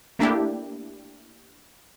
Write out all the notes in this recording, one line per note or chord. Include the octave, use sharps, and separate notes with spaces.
A3 A#3 D4 E4 G4